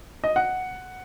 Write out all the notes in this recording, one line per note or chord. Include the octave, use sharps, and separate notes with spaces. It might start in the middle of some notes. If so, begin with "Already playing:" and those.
D#5
F#5